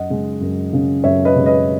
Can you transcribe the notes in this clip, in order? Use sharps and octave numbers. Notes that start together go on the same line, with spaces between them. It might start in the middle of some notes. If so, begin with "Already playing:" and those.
Already playing: F#2 D#5 F#5
C#3 G#3 C#4
F#2
C#3 G#3 C#4
F#2 C#5 E5
B4 D#5
C#3 G#3 C#4
B4 D#5